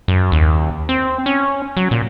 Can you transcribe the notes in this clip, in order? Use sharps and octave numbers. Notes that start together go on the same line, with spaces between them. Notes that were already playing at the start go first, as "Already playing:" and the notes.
F#2
D#2
C4
C#4
F#3
A#2